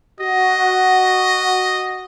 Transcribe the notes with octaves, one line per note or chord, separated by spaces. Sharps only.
F#4 D#5